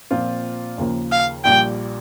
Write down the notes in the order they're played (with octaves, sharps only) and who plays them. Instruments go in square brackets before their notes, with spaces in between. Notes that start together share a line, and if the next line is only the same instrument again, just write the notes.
[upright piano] A#2 F3 C4 F4
D#2 C#3 F3 A#3
[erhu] F5
[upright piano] A#1 A#2 G3 [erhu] G5